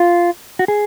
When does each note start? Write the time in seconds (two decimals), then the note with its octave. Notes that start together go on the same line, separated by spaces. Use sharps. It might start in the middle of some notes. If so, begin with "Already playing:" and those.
Already playing: F4
0.59 F#4
0.68 G#4